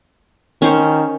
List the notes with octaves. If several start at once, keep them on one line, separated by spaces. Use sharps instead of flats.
D#3 C#4 C5 C#5